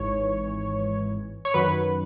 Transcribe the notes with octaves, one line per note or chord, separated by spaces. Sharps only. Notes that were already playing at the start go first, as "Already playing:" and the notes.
Already playing: G#1 G#2 E3 C#5
C#5
F#2 D#3 F#3 B4